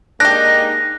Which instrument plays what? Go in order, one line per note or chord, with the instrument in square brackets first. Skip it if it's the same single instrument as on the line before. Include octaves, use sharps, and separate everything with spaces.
[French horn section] G#3 A#3 D#4 [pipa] D4 G4 [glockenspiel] F#6 [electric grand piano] A#6